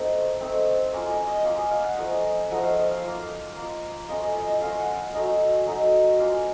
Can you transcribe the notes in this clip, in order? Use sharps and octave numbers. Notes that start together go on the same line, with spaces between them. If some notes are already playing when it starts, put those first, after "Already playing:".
Already playing: A3 C4 D#4 C5
A3 C4 D#4
A#3 C#4 F4
D#5
D#5
A#3 C#4 F4 F5
D#5
F5
F#5
F3 A3 D#4 D#5
F3 A3 D#4 F#5
F5
D#5
F5
A#3 F4
A#3 F4
A3 C#4 F4 D#5
D#5
D#5
D#5
A3 C#4 F4 F5
F#5
F5
F#3 A3 D#4 D#5
F#3 A3 D#4
A#3 C#4 F4 F5